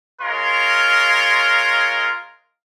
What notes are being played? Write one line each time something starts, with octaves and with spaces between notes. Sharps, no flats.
G#3 F4 A#4 C#5 C6